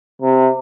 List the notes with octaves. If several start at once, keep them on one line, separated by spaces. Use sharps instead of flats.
C3